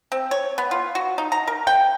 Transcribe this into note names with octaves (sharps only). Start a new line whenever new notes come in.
C4
C#5
B3
F4
F#4
D#4
A#5
A#4
G5